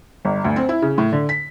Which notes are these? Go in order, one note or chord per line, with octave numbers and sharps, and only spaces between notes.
G1
D2
C4
E4
C#3
A2
D3
B6